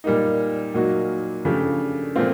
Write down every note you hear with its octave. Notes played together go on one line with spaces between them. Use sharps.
A#2 G3 A#3 D#4
A#2 F#3 A#3 D#4 F#4
C#3 F3 A3 D4 G4
A#2 F3 A3 C4 F4